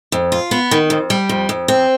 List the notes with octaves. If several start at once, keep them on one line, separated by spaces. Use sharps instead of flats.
F2
F4
B3
D#3
F2
G3
F2
F2
C4